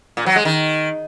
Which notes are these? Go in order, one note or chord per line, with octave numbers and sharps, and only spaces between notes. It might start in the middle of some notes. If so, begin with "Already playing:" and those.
A#2
F#3
G#3
D#3